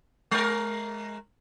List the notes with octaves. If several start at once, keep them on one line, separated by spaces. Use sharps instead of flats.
G#3 A#4